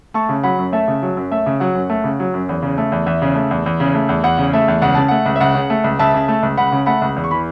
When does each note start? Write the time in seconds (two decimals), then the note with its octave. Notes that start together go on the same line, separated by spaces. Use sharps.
0.14 A3 A5 C#6
0.29 C#3
0.43 F#3 F#5 B5
0.59 F#2
0.72 A3 E5 A5
0.88 C#3
1.03 F#3
1.17 F#2
1.31 A3 E5
1.46 C#3
1.60 F#3 F#5
1.75 F#2
1.90 A3
2.04 C#3
2.20 F#3
2.34 F#2
2.49 E2
2.62 C#3
2.78 A3
2.92 E2
3.06 E2 E5
3.22 C#3
3.36 A3
3.51 E2
3.66 E2
3.80 C#3
3.95 A3
4.09 E2
4.23 E2 F#5
4.38 C#3
4.53 A3 E5
4.68 E2
4.82 C#2 F#5
4.95 C#3 A5
5.08 A3 F#5
5.25 C#2
5.36 E5
5.41 C#2 F#5
5.55 C#3
5.70 A3
5.84 C#2
5.99 C#2 E5 A5
6.14 C#3
6.28 A3
6.43 C#2
6.58 C#2 F#5 B5
6.72 C#3
6.86 A3 F#5 B5
7.01 C#2
7.16 E2
7.24 C#6
7.31 E3 B5